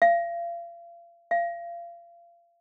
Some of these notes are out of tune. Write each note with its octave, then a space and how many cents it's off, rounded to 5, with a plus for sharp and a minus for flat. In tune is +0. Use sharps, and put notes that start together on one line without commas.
F5 -35
F5 -30